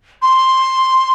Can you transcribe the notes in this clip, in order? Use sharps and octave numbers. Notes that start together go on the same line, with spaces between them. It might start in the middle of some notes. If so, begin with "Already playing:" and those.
C6